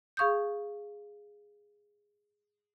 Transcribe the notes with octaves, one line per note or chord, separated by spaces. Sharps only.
G#4 F5 C#6 D#6 G6